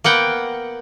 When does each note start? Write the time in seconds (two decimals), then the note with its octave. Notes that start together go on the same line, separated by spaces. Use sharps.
0.04 A#3 B3 F#5 G5